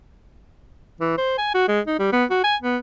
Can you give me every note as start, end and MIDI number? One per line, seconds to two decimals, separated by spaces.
1.01 1.15 52
1.18 1.35 72
1.38 1.53 80
1.54 1.66 66
1.68 1.80 56
1.87 1.97 63
1.99 2.08 55
2.13 2.24 59
2.30 2.41 66
2.44 2.56 80
2.62 2.77 59